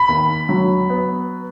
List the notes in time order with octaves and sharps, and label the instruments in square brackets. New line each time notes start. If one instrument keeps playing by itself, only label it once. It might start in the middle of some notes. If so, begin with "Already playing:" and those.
Already playing: [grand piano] B5
[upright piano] D#2
F#3
B3